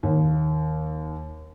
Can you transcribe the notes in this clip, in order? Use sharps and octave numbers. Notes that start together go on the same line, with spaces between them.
D#2